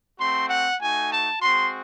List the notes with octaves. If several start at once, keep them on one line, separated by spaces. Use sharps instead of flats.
A3 C4 F#4 C6
F#5
A3 D#4 F#4 G#5
A5
G#3 C4 F#4 C6